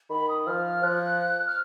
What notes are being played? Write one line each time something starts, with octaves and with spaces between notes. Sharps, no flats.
D#3 B5
D#6
F3 F6
F6
F3 F#6
F6